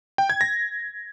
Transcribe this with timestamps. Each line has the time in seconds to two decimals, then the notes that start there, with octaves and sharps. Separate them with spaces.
0.18 G5
0.30 G#6
0.41 A#6